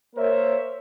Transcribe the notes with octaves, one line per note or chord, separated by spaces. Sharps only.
A#3 A#4 C5 C#5 E5